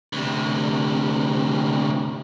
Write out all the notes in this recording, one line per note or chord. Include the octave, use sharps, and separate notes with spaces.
D2 C3